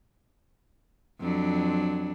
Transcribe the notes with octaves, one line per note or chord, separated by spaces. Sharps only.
F2 F#3 D4